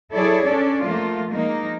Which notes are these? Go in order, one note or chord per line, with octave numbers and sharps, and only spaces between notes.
F#3 E4 G#4 A4 C#5 D5
C#4 D4 A4 D5
F3 A3 A#3 F4
F3 G#3 A#3 D#4